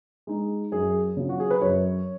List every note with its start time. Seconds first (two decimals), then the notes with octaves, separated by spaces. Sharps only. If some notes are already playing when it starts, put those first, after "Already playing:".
0.27 G#3 D#4
0.72 F#2 G#4
1.17 C#3 F#3
1.29 F#4
1.40 G#4
1.50 B4
1.61 F#2 C#5